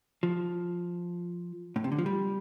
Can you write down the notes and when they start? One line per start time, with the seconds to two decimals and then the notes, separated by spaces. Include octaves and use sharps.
0.23 F3
1.76 A2
1.84 C3
1.92 D3
1.99 F3
2.06 G3